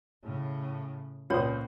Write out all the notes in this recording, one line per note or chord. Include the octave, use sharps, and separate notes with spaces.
A2 C#3
C#2 A#2 F4 C5 C#5 D#6